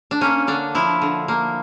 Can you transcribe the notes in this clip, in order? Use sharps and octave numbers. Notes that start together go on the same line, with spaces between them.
D4
A#3 C#4
D3 D4
F3 E4
D3
A#3